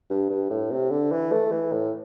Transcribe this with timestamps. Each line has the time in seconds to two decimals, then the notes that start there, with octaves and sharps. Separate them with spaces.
0.10 G2
0.30 G2
0.50 A2
0.71 C3
0.91 D3
1.12 E3
1.32 A3
1.52 E3
1.72 A2